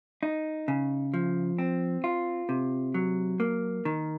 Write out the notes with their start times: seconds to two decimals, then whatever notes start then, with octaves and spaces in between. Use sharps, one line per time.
0.23 D#4
0.68 C#3
1.14 F3
1.58 C4
2.04 F4
2.49 C3
2.94 F#3
3.40 A#3
3.85 D#3